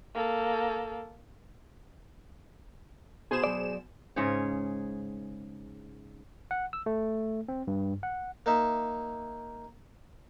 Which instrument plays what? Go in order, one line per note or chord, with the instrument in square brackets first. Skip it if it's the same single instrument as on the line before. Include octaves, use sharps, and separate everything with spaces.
[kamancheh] A#3 A4
[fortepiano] B2 [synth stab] G#4 C5 E7
[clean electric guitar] F#3 D5
[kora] G#2 C#3 G#4 C#5
[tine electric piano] F#5
E6
A3
C4
G2
F#5
[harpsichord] A#3 D#4 E5